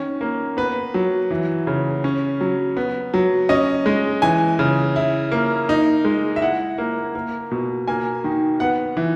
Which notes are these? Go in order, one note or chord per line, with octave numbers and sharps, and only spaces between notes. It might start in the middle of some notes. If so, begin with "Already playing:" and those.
Already playing: D#3 C#4
A#3
B3 B4
F#3
E3
C#3
C#4
F#3
B3
F#3
C#4 D#5
G#3
E3 G#5
C#3
E4
A#3
D#4
G#3
E5
E4 F#5
A#3
A#3
B2
A#3 G#5
D#3
B3 F#5
E3